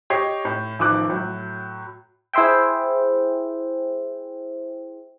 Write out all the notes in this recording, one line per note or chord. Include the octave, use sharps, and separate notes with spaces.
G4 C#5 D#5 C7
A2
A1 D#3 F3 D6 F#6
A2 F#3
E4 G#4 C5 E5 G5